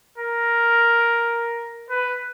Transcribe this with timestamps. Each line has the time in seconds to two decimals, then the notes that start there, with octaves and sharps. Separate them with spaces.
0.18 A#4
1.90 B4